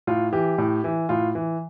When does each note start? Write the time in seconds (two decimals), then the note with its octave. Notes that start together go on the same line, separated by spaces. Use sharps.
0.07 A2 F4
0.32 E3 G4
0.58 A2
0.84 E3
1.09 A2 F4
1.35 E3